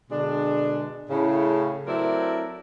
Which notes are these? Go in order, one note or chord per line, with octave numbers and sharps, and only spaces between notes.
B2 D3 G#3 D4
A2 C#3
F#3 A3 C4 E4 A#4 D5